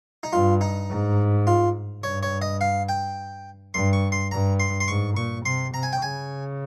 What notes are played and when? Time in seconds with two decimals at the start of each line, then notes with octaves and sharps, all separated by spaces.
0.23 D#4
0.33 G2 F4
0.61 D#4
0.90 G#2
1.47 F4
2.03 G2 C#5
2.23 C#5
2.42 D#5
2.61 F5
2.89 G5
3.74 G2 C6
3.93 C#6
4.12 C6
4.31 G2 A#5
4.60 C6
4.80 C6
4.88 G#2 C#6
5.17 A#2 C#6
5.45 C3 C6
5.74 C3 A#5
5.83 G#5
5.93 G5
6.02 C#3 G#5